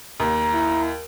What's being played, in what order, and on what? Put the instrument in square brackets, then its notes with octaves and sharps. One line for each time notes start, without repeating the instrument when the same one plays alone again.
[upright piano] D#2 [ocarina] A#5
[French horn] E4